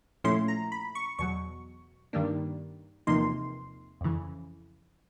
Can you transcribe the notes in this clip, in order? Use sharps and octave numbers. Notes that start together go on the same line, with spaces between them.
A#2 F3 A3 C#4 E4 C6
A#5
B5
C#6
E2 B2 F#3 C#6
G2 D#3 G3 A#3 D4
E2 C3 F3 A#3 D#4 C6
F2 C#3 E3